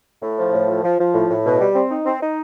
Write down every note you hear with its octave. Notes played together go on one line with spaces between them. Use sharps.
A2
F3
A2
F3
F3
F3
A2
A2
B2
G3
C4
D#4
C4
D#4